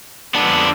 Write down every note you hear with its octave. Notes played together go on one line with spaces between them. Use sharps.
F2 D3 G#3 B3 D4